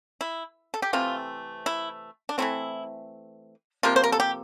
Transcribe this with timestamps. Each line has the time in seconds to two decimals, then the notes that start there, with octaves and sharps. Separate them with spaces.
0.21 E4
0.74 A4
0.82 G4
0.93 C3 E3 A3 C4 F4
1.66 E4
2.29 D4
2.38 E3 A3 C4 E4
3.83 C3 F3 A#3 F4
3.96 C5
4.04 A#4
4.12 A4
4.20 G4